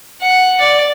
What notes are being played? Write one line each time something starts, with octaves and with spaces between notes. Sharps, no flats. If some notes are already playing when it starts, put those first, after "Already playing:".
F#5
D5